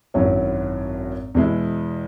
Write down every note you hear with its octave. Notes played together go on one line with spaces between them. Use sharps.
G#1 F#2 F#3 C#4 E4
E2 B2 G#3 E4